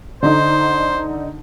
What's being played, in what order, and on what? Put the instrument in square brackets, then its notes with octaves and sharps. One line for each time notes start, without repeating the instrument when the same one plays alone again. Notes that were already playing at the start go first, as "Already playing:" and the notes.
[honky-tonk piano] D3 D#4 [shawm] C5